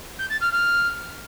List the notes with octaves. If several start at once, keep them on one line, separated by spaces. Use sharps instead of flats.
G6
A6
F6
F6